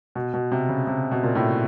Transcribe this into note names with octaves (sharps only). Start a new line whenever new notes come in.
B2
B2
C3
C#3
C3
B2
A#2
A2